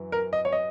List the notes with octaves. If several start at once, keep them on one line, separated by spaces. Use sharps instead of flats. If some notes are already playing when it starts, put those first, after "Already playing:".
Already playing: F#2 E3
A#4
D#5
C#5
D#5